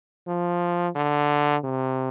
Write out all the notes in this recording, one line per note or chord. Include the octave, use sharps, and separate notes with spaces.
F3
D3
C3